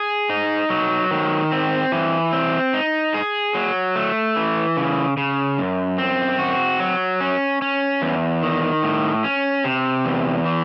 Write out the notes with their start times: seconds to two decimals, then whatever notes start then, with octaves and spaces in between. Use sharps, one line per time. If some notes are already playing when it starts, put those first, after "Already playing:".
Already playing: G#4
0.30 D#4
0.70 F#3
1.11 D#3
1.52 C4
1.92 E3
2.32 C4
2.73 D#4
3.14 G#4
3.55 F#3
3.96 A3
4.36 E3
4.77 C#3
5.17 C#3
5.58 F#2
5.98 C4
6.39 F#4
6.80 F#3
7.21 C#4
7.62 C#4
8.02 E2
8.43 D#3
8.83 A2
9.24 C#4
9.64 C3
10.05 E2
10.46 E3